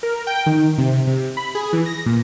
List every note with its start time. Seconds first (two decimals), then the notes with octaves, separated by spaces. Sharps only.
0.03 A#4
0.27 G5
0.46 D#3
0.78 C3
1.07 C3
1.37 B5
1.55 G#4
1.73 E3
1.86 A#6
2.06 A#2